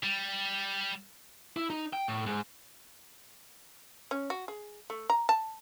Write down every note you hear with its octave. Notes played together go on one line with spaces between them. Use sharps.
G3
E4
D#4
G5
A2
G#2
C#4
F#4
G#4
A3
A#5
A5